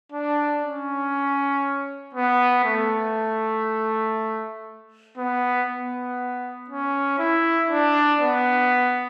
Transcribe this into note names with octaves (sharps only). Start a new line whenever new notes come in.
D4
C#4
B3
A3
B3
B3
C#4
E4
D4
B3